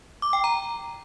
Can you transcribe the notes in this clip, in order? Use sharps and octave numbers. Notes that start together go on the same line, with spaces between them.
D6
G5
A#5